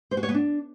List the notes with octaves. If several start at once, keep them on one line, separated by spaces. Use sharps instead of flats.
C5
F#4
C#5
B3
D4